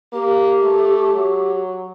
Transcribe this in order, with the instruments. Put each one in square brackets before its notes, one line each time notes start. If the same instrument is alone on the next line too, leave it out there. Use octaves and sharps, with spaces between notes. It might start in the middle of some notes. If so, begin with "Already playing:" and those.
[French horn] A#3 [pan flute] G4
[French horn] A3
F#3